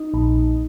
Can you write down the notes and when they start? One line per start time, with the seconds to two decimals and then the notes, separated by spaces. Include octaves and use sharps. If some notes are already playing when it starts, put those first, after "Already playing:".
Already playing: D#4
0.14 A#1